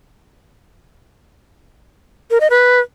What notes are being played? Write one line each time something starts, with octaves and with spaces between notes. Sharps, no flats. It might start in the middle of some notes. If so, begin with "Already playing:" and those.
A#4
D#5
B4